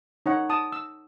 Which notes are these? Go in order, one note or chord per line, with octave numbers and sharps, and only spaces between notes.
D#4 C#5 F#5
A5 D#6
E6